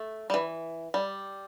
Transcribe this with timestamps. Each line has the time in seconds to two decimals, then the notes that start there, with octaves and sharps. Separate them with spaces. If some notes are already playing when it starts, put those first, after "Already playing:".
Already playing: A3
0.30 G3
0.34 E3
0.94 G3